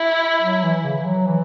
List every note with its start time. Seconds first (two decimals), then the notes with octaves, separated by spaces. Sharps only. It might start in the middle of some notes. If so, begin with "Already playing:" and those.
Already playing: E4
0.42 F#3
0.63 E3
0.84 C#3
0.97 E3
1.05 F#3
1.27 E3